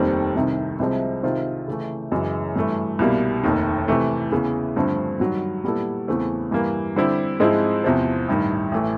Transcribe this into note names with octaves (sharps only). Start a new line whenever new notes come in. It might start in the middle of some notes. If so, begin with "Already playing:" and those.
Already playing: F1 D#2 D#3 G3 C4
C2 C3 D#3
C2 C3 F3 G#3 C4
C3 D#3 G#3 C4 F4
C#3 E3 A3
F#2 C#3 E3 G#3
G2 E3 A3
C2 B2 G3 A#3
F1 D#2 D#3
C3 E3 A3
E2 C#3 E3
G2 D3 F3 A3 C4
G2 D#3 F#3
A#2 G3 B3 E4 A4
E2 C#3 E3 A3 C4
G2 E3 G3 A#3
D3 G3 C4 E4 G4
G#2 F3 G#3 C4 E4
E2 C3 F3
A1 G2 D#3
A1 E3 A3